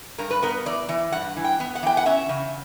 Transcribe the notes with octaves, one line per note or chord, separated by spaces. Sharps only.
G2 A#4
B4
B3 A#4
E3 D5
E3
G2 F#5
E3
G5
B3
F#5
E3 G5
F#5
C#4 E5
C#3